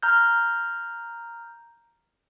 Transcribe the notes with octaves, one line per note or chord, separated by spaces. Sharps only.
A#5 F6 G6